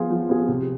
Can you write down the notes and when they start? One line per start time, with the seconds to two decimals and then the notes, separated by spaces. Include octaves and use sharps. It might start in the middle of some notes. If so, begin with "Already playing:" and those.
Already playing: F3 B3 F4 G#4
0.10 F3
0.29 B3 F4 G#4
0.48 C3